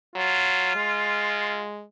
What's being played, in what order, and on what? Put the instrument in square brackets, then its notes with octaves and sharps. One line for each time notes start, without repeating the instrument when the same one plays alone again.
[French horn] F#3 [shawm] F4
[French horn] G#3